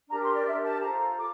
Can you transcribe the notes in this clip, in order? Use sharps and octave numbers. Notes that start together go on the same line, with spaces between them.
D4 G4 A#4 A#5
C6
D5
D4 G4 A#4 E5
A5
F4 A4 C5 A#5
F4 D6